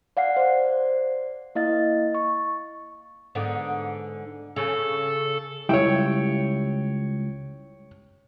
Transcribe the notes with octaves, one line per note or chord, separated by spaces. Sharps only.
D5 F5 F#5 C7
C5 D5
A#3 E4 D#5 F5 A6
C#6
G#2 D3 B3
C#3 A4
C#2 G3 E4 C#5 G5